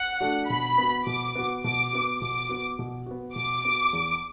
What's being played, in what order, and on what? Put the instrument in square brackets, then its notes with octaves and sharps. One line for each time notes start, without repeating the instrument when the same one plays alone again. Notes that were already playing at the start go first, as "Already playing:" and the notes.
Already playing: [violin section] F#5
[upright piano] A3 D4 F#4
[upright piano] B2 [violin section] B5
[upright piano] B3 F#4
[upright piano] B2 [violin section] D6
[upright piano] B3 F#4
[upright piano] B2 [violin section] D6
[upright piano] B3 F#4
[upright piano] B2 [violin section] D6
[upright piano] B3 F#4
B2
B3 F#4
[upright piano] B2 [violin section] D6
[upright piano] B3 F#4
E2